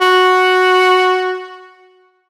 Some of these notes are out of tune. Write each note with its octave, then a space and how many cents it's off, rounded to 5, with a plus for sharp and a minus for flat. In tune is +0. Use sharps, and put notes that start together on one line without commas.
F#4 -5